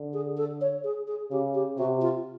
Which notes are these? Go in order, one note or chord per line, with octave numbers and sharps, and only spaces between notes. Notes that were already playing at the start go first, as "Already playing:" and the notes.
Already playing: D3
G#4
A4
C#5
G#4
G#4
C#3 G4
G4
C3 F#4
F4